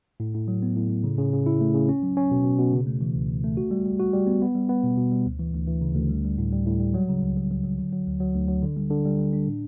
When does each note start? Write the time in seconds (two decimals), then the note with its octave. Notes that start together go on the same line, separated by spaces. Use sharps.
0.20 A2
0.34 A2
0.48 F#3
0.62 B3
0.76 A2
0.90 A2
1.04 C#3
1.18 C#3
1.33 C#3
1.46 E4
1.61 A3
1.74 C#3
1.89 C#4
2.03 F#3
2.17 C#4
2.31 B2
2.45 B2
2.59 B2
2.73 C#3
2.87 A3
3.01 E3
3.15 C#2
3.29 C#3
3.44 A3
3.57 F#4
3.71 G3
3.86 G3
3.99 F#4
4.13 G3
4.27 B3
4.42 B3
4.55 G3
4.69 B3
4.84 B2
4.98 B2
5.12 G3
5.26 D2
5.40 E3
5.54 D2
5.67 E3
5.82 C#3
5.96 D2
6.10 G3
6.25 G3
6.38 A2
6.52 G3
6.66 A2
6.80 G3
6.94 F#3
7.09 C#3
7.22 C#2
7.37 F#3
7.51 F#3
7.64 F#3
7.79 D3
7.92 F#3
8.07 D2
8.20 F#3
8.35 D2
8.48 F#3
8.62 D3
8.77 G3
8.91 D3
9.05 G3
9.19 G3
9.33 D4
9.47 A2